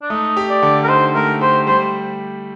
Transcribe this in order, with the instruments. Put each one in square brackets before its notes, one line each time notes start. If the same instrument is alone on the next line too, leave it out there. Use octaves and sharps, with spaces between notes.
[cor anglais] D4
[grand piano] A3 [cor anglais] D#4
[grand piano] G4
[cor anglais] D5
[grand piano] D3
[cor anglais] A#4
[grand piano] D#4 [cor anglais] C5
[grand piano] A3 [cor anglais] A#4
[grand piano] G4 [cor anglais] C5
[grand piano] G3 [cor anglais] C5